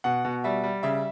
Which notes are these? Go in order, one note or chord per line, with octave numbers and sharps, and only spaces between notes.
B2 F#5
B2
G3 E5
G3
C#3 E5